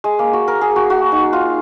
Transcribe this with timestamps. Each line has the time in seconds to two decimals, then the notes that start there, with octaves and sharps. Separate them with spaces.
0.04 G#3
0.19 A#3
0.33 F#4
0.48 A#4
0.61 G#4
0.76 F#4
0.90 F#4
1.12 D#4
1.33 F4